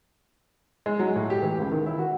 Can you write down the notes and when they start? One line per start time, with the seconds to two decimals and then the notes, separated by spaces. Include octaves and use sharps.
0.86 G#3
0.99 F#3
1.16 A2
1.30 G4
1.42 E3
1.58 C#2
1.72 D#3
1.86 E4
1.99 F#4